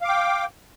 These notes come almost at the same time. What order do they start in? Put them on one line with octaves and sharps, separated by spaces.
F5 D6 G5